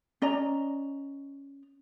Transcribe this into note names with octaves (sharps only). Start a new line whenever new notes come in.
C#4 D5 D#5 A#5